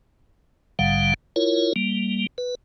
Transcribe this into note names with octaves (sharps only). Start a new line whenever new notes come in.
A#1 G#2 D3 G3 F5 F#5
E4 F4 A#4 C#5
G3 A#3
B4